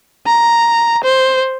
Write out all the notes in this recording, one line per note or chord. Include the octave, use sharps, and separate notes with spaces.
A#5
C5